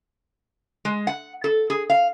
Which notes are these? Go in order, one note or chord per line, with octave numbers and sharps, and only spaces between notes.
G#3
F#5
A4
G#4
F5